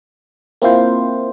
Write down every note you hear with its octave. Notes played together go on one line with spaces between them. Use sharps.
A#3 C4 E4 F4 C5